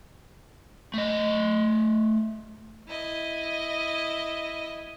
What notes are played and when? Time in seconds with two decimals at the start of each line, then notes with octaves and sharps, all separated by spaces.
0.94 A3 D#5
2.88 E4 D#5